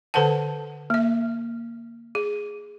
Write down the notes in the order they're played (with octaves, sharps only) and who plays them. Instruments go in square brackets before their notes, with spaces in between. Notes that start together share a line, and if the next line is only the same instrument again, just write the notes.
[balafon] D3 A4 B4 C5 F#5 A5
A#3 E5
G#4